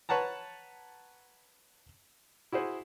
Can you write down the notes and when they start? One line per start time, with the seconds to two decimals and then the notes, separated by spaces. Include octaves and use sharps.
0.09 B4 C#5 F#5 A5 A#5
2.52 E4 F#4 G#4 C5